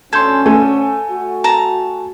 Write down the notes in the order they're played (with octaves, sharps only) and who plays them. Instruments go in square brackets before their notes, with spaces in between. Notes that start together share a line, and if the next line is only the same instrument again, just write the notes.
[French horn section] D2 C#4 [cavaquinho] A4 [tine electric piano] C6 G6 G#6
[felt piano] A3 [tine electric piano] G#5
[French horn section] F#4
[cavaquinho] A5 A#5